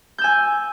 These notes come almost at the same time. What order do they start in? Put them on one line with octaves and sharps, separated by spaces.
G6 E6 G#5